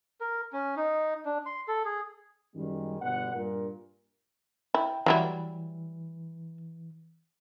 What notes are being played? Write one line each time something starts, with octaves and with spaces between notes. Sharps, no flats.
A#4
C#4
D#4
D4
C6
A4
G#4
F#2 D#3 G3 G#3
G1 G2 B2 D3 B4 F#5
G2 A#2 A#4
E4 G5
E3 F#3 G3 E4